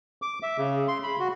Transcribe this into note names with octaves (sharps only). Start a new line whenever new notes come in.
D6
E5
C#3
C6
B5
F#4